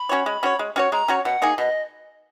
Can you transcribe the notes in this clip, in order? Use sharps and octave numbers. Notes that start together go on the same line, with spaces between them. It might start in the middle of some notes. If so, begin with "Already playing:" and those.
Already playing: B5
C#4 F#4 C#5
G#3
C#4 F#4 C#5
G#3
C#4 F#4 C#5
G#3 A#5
C#4 F#4 C#5
B2 F#5
A#3 D#4 G#4
B2 D#5